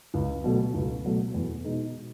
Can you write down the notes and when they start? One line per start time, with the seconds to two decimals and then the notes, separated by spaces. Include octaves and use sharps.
0.14 C#2
0.44 B2 F#3 A3
0.74 C#2
1.04 B2 F#3 A3
1.34 E2
1.64 B2 G#3 D#4